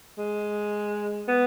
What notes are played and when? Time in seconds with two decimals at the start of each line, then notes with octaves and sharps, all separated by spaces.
0.18 G#3
1.28 B3